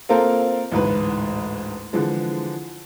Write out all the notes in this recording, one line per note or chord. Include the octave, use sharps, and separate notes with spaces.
A#3 C4 F4 A4 A#4 C5
A1 D2 G#2 B4
D3 E3 F3 G#3